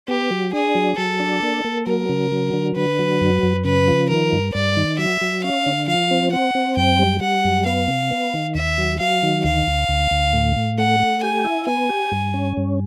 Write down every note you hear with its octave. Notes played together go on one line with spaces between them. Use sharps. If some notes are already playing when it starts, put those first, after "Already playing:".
B3 G4
F#3
D4 G#4
F#3
F#3 A4
D4
A#3
A#3
F#3 A#4
C#3
F#3
D3
D3 B4
F#3
F#2
F#2
C#3 B4
F3
D#3 A#4
G2
G2 D5
D#3
F#3 E5
F#3
C#4 F5
D3
F3 F5
C4
C4 F#5
C4
F#2 G5
G3
G3 F#5
F#2
B3 F5
C3
B3
D#3
D#2 E5
F#3
F#3 F5
D#3
D2 F5
D2
D2
D2
A2
A2
A3 F#5
A3
G4 G#5
E4
B3 G#5
G4
G2
C#4
G2